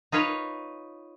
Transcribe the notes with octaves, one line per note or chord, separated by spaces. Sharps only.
D#4 F4 B4 C#5